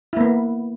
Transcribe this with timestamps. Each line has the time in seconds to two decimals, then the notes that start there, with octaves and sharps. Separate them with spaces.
0.13 E4
0.17 A#3
0.21 B3